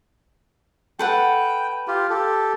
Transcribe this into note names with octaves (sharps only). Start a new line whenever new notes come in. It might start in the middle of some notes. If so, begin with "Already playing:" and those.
A4 B4 F#5 G5
F4 G4
G4 A4